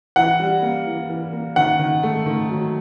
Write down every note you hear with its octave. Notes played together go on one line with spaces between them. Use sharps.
E3 F#5
G3
A#3
E3
E3
A#3
D#3 F#5
D#3
A3
D#3
F#3